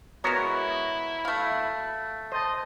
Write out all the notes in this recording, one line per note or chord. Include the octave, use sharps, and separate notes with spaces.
G#3 B3 E4 F#4 A#4 C#5
A3 F5
C5 D#5 A5